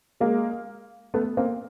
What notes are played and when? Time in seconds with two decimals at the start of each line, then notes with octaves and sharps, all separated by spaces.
0.20 G#3 A#3
1.14 A3 B3
1.37 A#3 C4